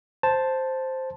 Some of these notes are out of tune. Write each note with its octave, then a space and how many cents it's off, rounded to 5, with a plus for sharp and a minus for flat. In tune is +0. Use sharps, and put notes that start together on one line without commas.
C5 +0 A5 +0